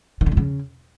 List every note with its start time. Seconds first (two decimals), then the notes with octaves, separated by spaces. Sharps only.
0.21 D#3
0.26 D3
0.32 F2
0.37 C#3